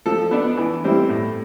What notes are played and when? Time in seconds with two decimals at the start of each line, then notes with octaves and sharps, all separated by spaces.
0.06 F3 A4
0.31 B3 D4
0.57 E3
0.84 G3 C4 E4
1.09 A2